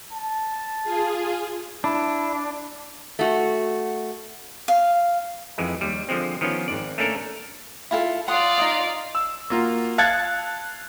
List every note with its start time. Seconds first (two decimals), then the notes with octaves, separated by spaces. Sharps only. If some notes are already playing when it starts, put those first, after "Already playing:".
0.12 A5
0.84 F4 G#4
1.84 D4 E4
3.19 A3 F#4
4.68 F5
5.58 F2 E3 G#3
5.81 D#2 G3
6.09 D3 F3 G#3 C4
6.41 D#3 F3 B3 C#4
6.68 G#1 G#2 D5
6.98 A3 A#3 C#4 D4 A4 A#4
7.91 E4 F4 A4
8.28 F4 D5 F#5 C6 D#6
8.58 D#4 E4 D#6
9.15 E6
9.50 A#3 F4 F#4
9.98 F5 A5 F#6 G#6 A6 C#7